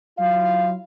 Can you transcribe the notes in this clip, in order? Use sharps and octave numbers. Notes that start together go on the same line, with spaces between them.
F#3 E4 F4 F5